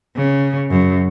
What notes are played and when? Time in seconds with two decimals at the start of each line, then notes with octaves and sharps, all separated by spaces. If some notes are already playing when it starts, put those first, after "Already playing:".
0.16 C#3
0.70 F#2